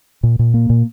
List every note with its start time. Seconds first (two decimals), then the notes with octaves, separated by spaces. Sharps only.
0.23 A#2
0.39 A#2
0.54 A#3
0.70 A#2